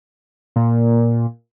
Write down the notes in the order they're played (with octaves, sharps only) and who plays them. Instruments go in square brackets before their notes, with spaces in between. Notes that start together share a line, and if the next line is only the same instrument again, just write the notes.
[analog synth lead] A#2